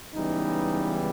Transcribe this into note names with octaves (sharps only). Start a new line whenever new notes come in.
C#2 C#3 E3 G3 B3 D#4